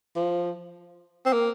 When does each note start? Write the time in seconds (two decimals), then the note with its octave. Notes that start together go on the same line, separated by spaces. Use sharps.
0.16 F3
1.26 C4
1.33 A#3